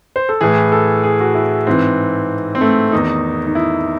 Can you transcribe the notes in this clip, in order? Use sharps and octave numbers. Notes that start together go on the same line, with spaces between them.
C5
A4
A2 E3 G#4
A4
G#4
F#4
E4
G#2 E3 C4
C4
A3
E2 D#3 D#4
D#4
E4